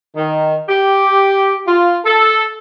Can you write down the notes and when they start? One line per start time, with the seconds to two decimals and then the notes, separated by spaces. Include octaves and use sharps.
0.16 D#3
0.69 G4
1.66 F4
2.05 A4